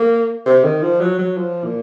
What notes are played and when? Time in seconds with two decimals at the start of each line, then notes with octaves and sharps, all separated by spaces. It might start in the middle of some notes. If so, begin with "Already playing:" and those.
Already playing: A#3
0.46 C3
0.64 D#3
0.82 F3
1.00 F#3
1.19 F#3
1.38 F3
1.64 A#2